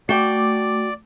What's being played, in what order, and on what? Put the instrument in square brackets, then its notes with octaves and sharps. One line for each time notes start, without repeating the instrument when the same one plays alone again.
[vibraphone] A3 D6 [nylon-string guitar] F#4 G5 [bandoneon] D5